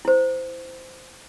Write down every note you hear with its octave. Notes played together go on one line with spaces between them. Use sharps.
E4 C5